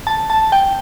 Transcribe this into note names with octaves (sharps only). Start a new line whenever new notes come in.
A5
A5
G5